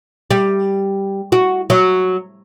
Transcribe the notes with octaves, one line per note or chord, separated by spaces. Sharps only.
G3
F#4
F#3